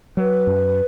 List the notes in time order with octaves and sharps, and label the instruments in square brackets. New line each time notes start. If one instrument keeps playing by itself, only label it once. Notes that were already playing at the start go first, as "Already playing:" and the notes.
[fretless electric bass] F#3 [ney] B4
[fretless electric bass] F#2